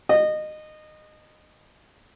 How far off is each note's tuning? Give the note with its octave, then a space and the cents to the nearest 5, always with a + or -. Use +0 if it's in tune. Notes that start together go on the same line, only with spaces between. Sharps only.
D#5 -20